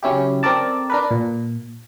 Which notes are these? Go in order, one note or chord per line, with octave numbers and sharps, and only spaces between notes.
C#3 F#3 C#4 E4 G4
C4 A4 A#4 D5 A5
D4 A#4 B4
A#2